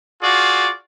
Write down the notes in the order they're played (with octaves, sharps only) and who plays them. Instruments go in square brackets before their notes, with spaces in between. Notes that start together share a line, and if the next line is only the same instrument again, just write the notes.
[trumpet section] F4 F#4 G#4 D5